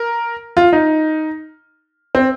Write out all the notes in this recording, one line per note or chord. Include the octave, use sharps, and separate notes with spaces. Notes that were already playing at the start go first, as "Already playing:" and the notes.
Already playing: A#4
F4
D#4
C4